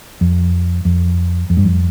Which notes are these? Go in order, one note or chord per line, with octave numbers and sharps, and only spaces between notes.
F2
F2
F2
G2
F2